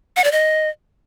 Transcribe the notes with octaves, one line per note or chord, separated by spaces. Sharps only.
F#5
D5
D#5